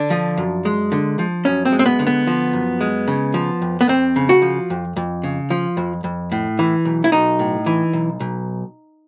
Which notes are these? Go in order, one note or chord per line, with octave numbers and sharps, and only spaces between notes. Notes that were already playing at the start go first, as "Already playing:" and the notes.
Already playing: D3 D4
F3
F#2
G#3
D3
F3
F#2 C#4
C4
G#3
C4
B3
D3
B3
F3
F#2
G#3
C#3
F3
F2
B3
F2 C4
C#3
F#4
F3
F2
F2
C#3
F3
F2
F2
A2
E3
B1
E4
B1 D#4
A2
E3
B1
B1